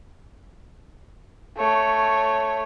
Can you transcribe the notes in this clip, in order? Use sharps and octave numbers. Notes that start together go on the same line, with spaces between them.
A3 C#5